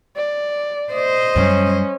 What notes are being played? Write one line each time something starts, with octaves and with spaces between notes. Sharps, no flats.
D5
C5 D#5
F#2 G3 C#4